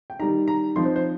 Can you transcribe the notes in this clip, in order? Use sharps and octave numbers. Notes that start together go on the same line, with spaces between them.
G5
D#3 G3 D#4 A#5
A#5
F3 C4 D#4 C6
C5
C5